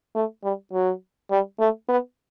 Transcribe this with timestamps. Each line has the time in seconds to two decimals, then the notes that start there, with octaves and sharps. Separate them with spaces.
0.16 A3
0.44 G3
0.73 F#3
1.31 G3
1.60 A3
1.89 B3